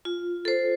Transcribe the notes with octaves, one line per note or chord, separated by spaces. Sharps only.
F4
A4 C5